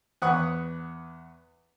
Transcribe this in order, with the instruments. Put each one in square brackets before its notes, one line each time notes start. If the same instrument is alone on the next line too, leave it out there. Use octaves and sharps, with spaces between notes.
[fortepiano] E2 B4 F#5 C#6 D#6